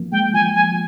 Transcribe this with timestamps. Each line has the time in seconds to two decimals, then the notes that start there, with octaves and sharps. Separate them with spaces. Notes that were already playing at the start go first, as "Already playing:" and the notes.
Already playing: F3 A#3
0.12 G#3 G5
0.33 F3 G#5
0.55 G#5
0.72 F3